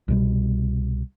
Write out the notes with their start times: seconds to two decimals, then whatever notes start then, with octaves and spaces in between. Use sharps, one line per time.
0.08 C2 B2 G3